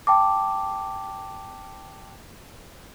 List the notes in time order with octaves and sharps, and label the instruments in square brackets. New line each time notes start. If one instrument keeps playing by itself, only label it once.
[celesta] G5 A5 D6